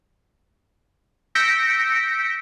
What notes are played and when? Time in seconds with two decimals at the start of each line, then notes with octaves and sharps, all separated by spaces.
1.35 E6 G6 A#6 B6 C#7 D7